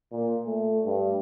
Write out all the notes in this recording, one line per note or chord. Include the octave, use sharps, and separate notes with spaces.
A#2
A3
G2